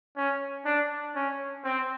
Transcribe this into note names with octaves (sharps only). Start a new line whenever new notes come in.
C#4
D4
C#4
C4